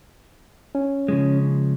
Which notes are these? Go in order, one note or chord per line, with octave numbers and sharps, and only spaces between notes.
C#4
C#3 F3 G#3